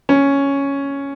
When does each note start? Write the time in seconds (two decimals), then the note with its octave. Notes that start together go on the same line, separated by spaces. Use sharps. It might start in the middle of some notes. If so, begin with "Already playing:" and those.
0.09 C#4